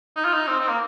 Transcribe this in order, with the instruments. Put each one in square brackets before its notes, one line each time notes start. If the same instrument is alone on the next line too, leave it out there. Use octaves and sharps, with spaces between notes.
[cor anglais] D#4
F4
D#4
C4
C4
A#3